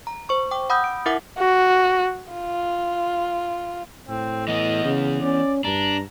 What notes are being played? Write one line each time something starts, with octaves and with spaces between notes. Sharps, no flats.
A#5
C5 C#6
G5 D6
F#5 B5 D#6 E6 G6
D7
E4 A#4 E5 F#5 D6
F#4
F4
A2 C4
E3 B3 D#5
C#3
C#4 D5
G2 D4 A#5